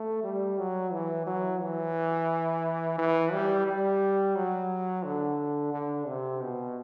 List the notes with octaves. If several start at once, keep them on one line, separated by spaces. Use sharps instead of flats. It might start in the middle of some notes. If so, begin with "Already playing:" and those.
Already playing: A3
G3
F#3
E3
F#3
E3
E3
G3
G3
F#3
D3
D3
C3
B2